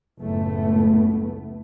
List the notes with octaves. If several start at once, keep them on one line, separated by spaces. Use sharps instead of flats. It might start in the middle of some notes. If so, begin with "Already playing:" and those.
F#1 C#2 A2 A3 B3